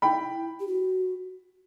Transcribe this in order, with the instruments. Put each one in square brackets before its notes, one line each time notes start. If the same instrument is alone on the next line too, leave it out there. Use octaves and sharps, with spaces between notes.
[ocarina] E4 [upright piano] G5 B5
[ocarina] G4
F#4